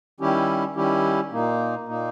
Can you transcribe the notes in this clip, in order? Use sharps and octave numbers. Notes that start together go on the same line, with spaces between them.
D#3 G3 C#4 E4 G4
D#3 G3 C#4 E4 G4
A#2 A#3 D#4
A#2 A#3 D#4